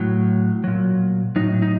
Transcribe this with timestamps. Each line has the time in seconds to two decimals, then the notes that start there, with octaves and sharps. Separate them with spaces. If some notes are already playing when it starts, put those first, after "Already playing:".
Already playing: A2 F#3
0.64 A#2 F#3
1.36 A2 F#3 D#4
1.62 D#4